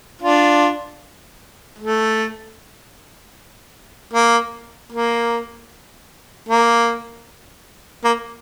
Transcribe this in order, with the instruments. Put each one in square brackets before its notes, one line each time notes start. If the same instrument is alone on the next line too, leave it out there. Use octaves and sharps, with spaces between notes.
[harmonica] D4 F4
A3
A#3
A#3
A#3
A#3